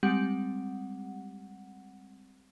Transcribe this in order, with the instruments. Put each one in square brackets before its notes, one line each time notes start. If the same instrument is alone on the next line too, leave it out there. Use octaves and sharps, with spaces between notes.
[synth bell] G3 G#3 C4 G4 F#5